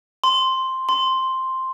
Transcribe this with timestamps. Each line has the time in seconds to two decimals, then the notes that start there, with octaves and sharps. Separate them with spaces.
0.24 C6
0.89 C6